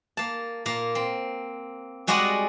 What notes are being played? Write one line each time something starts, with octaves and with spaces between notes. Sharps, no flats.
A#3 A5
A#2 A#3
C4
G3 G#3 F#4 D5 D#5 F#5